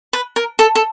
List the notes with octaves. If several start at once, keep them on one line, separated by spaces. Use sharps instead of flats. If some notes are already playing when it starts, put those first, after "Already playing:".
B4
A#4
A4
A4